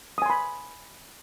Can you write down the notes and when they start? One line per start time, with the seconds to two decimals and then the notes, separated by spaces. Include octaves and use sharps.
0.18 D#6
0.22 G#5
0.26 C6
0.30 B5